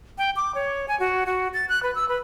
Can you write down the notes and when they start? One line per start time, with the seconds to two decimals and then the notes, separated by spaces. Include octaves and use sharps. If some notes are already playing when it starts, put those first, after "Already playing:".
0.18 G5
0.36 D6
0.55 C#5
0.88 G#5
1.00 F#4
1.26 F#4
1.54 A6
1.69 F#6
1.83 B4
1.95 E6
2.09 B4